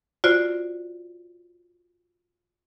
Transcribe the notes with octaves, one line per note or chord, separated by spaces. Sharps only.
F4 F#4 C5 D5